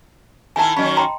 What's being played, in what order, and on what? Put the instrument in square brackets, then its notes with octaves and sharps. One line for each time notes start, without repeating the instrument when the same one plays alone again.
[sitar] D#3 E4 A#4 [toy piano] G#5 A5
[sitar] D#3 F#3 C#4 [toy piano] D#5 B5
[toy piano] G5 A#5 C6